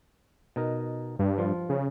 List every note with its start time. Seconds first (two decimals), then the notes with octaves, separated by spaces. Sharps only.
0.56 B2 D#4 A#4
1.19 G2
1.38 F3 F4
1.69 C#3